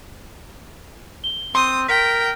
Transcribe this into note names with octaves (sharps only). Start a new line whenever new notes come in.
G7
C4 C6 D#6
A#4 G5 B6